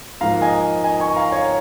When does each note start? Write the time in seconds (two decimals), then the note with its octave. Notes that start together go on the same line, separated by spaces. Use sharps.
0.21 G#2 F3 A#3 F5 A#5
0.42 D#5 G#5
0.84 D#5 G#5
1.00 G#5 C#6
1.16 F5 A#5
1.32 C#5 F5